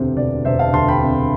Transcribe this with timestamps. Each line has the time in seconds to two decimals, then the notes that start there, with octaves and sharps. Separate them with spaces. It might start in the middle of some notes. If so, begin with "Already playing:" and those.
Already playing: E1 D2 C3 C5
0.17 E1 D5
0.45 E1 C5 E5
0.59 F5 A5
0.73 D2 A5 C6
0.88 G5 B5
1.01 C3